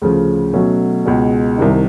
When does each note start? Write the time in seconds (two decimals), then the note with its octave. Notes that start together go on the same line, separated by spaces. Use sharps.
0.02 D2 C#3 F3
0.53 B2 F#3 A3 C#4
1.05 C#2 B2 G#3
1.58 C2 C3 D#3